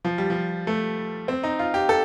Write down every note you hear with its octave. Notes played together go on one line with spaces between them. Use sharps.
F3
G3
F3
A3
C4
D#4
F4
G4
A4